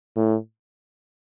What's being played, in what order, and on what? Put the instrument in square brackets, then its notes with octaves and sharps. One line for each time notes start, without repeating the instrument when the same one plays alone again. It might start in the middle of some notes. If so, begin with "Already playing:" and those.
[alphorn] A2